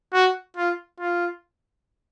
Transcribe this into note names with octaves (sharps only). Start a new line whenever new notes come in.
F#4
F4
F4